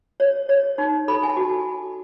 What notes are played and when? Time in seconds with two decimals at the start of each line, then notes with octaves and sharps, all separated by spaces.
0.20 C#5
0.49 C#5
0.78 D#4
1.08 A4 B5
1.23 G#5
1.29 A5
1.37 F#4